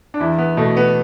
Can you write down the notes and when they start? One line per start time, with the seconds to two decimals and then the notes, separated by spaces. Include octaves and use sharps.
0.14 D4
0.20 E2 E4
0.38 B3
0.57 B2 A3
0.77 B3